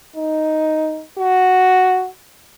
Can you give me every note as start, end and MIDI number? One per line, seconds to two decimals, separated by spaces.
0.16 1.02 63
1.18 2.08 66